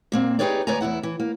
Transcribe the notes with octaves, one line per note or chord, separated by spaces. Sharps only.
A#2 A#3 C4
D#4 G4 G#4 B4 C#5 D5
D2 B4 C#5 D5 G#5 A#5
E2 G#2 E4 F#5
E3
A#3